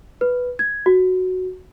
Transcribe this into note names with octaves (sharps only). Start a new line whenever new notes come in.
B4
G#6
F#4